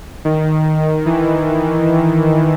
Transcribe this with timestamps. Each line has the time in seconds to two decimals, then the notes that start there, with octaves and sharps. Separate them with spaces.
0.25 D#3
1.06 E3